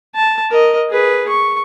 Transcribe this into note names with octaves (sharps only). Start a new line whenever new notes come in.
A5
A#4 D#5
G#4 B4
C#6